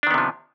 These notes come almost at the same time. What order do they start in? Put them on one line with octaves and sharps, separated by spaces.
D4 D#3 B3 C3 F3